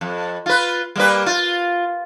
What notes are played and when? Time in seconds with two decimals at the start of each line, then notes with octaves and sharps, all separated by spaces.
0.01 F2
0.46 F4 B4
0.96 G3 A#3 B4
1.26 F4